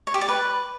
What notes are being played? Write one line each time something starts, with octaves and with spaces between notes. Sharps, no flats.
C#5
G4
D5
B4